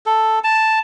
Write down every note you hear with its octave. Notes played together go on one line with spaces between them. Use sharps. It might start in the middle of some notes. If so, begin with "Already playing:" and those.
A4
A5